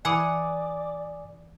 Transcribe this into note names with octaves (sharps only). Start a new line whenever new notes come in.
E3 D5 F#5 G#5 D6 D#6